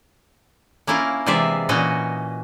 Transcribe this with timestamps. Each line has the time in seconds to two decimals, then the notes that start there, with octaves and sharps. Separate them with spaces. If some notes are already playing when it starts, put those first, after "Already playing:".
0.87 A#3 C#4 E4 F4 A#4
1.26 C3 E3 G#3 F4 D5 E5
1.69 A#2 E3 C#4 F#4 D#5